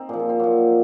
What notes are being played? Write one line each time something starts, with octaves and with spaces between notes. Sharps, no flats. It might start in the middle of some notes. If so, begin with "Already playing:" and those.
Already playing: C4 D#4
A#2 F3 G#4
G#4
C4
A#2 F3 F#3